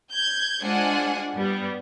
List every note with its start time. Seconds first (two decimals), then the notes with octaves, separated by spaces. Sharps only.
0.11 G6 G#6
0.62 G#3 D4 F4 C5 F#5 G#5
1.36 G2 G3 B3